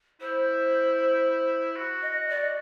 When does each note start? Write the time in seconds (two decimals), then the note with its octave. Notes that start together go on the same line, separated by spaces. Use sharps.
0.21 E4 C5
1.76 F#4
2.02 D#5
2.29 D5